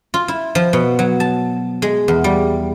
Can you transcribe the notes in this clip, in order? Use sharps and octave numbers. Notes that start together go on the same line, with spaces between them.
F4
E4
F3
B2
F#3
A5
G#3
E2
G3